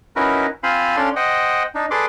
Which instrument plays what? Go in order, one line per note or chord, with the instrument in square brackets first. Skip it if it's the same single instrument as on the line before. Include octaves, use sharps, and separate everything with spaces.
[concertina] C#4 D#4 E4 F#4 A#4 B4
C4 F4 C5 F5 G#5 B5
C#4 D4 A4 D5 F5 C6
C5 D#5 F#5 G5
D4 D#4
G#4 A4 B4 D5 C6 D6